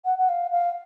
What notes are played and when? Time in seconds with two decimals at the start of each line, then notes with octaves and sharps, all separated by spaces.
0.05 F#5
0.18 F#5
0.28 F5
0.51 F5